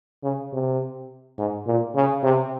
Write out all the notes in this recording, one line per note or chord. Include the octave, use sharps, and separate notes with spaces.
C#3
C3
G#2
A#2
C#3
C3